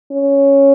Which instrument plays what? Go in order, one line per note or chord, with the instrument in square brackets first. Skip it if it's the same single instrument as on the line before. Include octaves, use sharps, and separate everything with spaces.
[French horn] C#4